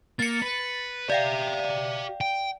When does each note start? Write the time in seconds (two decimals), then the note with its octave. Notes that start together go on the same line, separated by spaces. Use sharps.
0.19 A#3 A6 C#7
0.42 B4
1.10 G4 D5 E5 F5 G5
2.21 G5